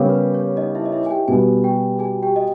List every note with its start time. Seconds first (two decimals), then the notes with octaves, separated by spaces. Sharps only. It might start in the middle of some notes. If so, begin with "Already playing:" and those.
Already playing: C#3 G3 B3 G4 A#4
0.10 B4
0.34 C#5
0.57 D#4 D#5
0.75 E4 E5
0.85 D#5
0.92 E4 E5
1.06 G#5
1.10 G4 G5
1.28 B2 G3 B3 G#4 G#5
1.64 G4 G5
1.99 G#4 G#5
2.23 G4 G5
2.36 D#5